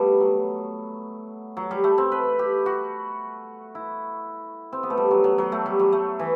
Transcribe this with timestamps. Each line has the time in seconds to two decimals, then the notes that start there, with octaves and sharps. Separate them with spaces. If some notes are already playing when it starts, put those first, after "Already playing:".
Already playing: G3 A3 B3
0.20 F#3
1.57 F#3
1.71 G3
1.84 A3
1.98 C4
2.12 B4
2.39 G4
2.66 F#4
3.75 E4
4.73 C4
4.83 B3
4.90 A3
4.97 G3
5.11 F#3
5.24 F#3
5.38 F#3
5.52 A3
5.66 G3
5.79 F#3
5.92 A3
6.19 E3